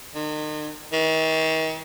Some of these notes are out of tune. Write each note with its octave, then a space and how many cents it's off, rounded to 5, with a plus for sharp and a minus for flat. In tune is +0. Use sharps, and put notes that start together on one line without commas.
D#3 -40
D#3 +40